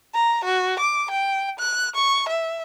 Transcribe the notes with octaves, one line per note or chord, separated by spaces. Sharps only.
A#5
F#4
D6
G5
F#6
C#6
E5